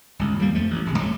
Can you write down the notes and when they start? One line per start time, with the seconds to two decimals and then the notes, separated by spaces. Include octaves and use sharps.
0.19 G1 C#2
0.39 D#2 G3 A#3
0.55 F2 F3 A3
0.71 A1
0.86 D1 G#1 C3
0.98 C2 F#3 A3